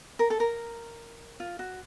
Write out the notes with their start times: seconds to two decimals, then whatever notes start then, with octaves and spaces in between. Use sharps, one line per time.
0.19 A#4
0.30 A4
0.40 A#4
1.40 F4
1.59 F#4